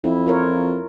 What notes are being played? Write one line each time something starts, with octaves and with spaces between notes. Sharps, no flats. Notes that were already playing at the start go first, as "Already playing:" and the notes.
F2 E4
F4 A#4 C#5